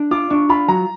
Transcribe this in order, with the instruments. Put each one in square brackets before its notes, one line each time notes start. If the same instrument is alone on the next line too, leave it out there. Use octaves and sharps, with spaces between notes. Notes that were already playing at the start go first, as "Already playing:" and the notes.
Already playing: [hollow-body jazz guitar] D4
[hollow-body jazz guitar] F4 [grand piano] D6
[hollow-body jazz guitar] D4 [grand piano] C#6
[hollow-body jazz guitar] F4 [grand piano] B5
[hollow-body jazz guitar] F#3 [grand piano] A#5